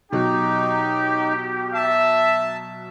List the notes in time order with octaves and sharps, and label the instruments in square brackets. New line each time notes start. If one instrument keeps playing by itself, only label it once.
[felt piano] B2 F#3 [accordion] D#4 [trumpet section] G4
[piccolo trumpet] E5 [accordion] A5